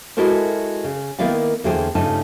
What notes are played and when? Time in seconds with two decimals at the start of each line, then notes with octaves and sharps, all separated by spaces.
0.17 G#3 E4 F#4 A4 A#4 C5
0.84 C#3
1.19 D#3 A#3 B3 E4 D5 F5
1.64 E2 D3 A#3 G#4 C5 G5
1.95 G2 C#3 A3 D#4 F4 A5